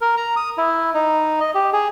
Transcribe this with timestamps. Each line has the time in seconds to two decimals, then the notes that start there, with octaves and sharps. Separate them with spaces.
0.01 A#4
0.17 A#5
0.36 D#6
0.58 E4
0.94 D#4
1.40 D#5
1.55 G4
1.73 G#4